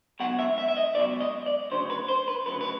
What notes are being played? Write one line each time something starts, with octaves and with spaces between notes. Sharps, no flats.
C#2 B2 F#3 F#5
E5
E5
E5
D#5
C#2 B2 F#3 D5
D#5
D5
D2 C#3 F#3 C5
B4
C5
B4
D2 C#3 F#3 B4
B4